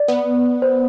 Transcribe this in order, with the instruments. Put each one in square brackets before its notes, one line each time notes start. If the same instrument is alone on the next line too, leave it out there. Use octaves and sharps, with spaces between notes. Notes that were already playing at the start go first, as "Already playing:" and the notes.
Already playing: [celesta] D5
[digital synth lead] B3
[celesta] C5